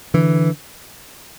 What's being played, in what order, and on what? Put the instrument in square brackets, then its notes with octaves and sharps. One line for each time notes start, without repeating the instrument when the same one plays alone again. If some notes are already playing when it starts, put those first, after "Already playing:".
[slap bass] D3 E3